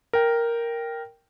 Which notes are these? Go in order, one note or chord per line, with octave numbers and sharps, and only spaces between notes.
A#4 G5